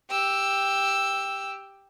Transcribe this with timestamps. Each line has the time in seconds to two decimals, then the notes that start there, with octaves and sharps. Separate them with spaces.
0.10 G4 E6